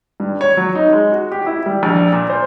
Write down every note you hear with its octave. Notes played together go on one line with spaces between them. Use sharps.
G2
C#5
F#3
D#4
G#3
F#4
G4
E4
G3
A#1
A#2
C5